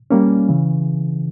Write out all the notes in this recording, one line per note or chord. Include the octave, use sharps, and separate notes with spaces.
G3 A#3 C#4
C#3 E3